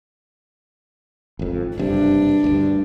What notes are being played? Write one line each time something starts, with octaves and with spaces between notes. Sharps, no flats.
G#1 F2
F#1 G2 C3 D4
D2 G2